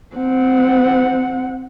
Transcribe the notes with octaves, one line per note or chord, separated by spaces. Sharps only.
C4 F#5